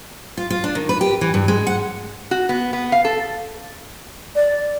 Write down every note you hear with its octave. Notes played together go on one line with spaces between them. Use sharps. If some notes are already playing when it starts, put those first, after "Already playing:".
F4
F4
D4
D#3
B4
G4
E3
G2
G#3
F#5
F#4
B3
B3
F5
A4
D5